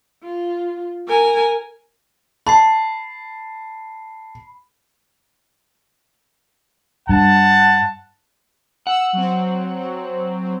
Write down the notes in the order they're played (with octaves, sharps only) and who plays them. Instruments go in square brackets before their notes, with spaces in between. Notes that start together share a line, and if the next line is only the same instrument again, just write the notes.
[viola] F4
A#4 G#5
[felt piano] A5 [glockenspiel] B5 C7
[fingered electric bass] G2 [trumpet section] F#5 A5
[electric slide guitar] F#5 [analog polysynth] E6
[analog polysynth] F#3 C4